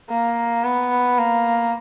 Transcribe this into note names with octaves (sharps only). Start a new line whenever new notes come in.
A#3
B3
A#3